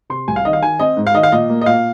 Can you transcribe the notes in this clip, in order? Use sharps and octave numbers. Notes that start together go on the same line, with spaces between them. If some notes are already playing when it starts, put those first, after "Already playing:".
C3 C6
C2 G#5
F5
D#3 D#5
F5
D#3 G#5
C4 D#5
G#2
F5
D#3 D#5
F5
A#2 D#5
A#3
D#5
A#2 F5